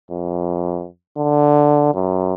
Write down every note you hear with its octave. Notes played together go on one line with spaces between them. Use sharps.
F2
D3
F#2